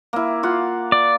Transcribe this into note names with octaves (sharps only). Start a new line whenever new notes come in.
A#3 E4
F4 F#5
D5